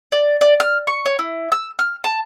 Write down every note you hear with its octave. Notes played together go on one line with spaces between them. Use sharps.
D5
D5
F6
C#6
C#5
E4
E6
F6
A5